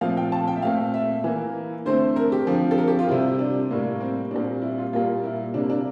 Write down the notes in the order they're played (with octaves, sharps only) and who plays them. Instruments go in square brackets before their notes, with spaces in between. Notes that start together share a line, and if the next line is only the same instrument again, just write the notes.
[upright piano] A#2 F3 A3 C4 F5
G5
A5
G5
E5
A#2 A3 C4 F5
E5
E3 A#3
D3 A3 C4 C5
A#4
G4
D3 F3 C4
A4
A#4
G4
F4
C3 G3 C4 E4
D4
A2 G3 A#3
C4
A#2 G3 C4 D4
E4
F4
A#2 G3 A#3 F4
E4
C3 G3 A#3 D4
D4